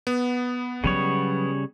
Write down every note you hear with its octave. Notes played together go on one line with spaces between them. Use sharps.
B3
C#3 F#3 G3 C#5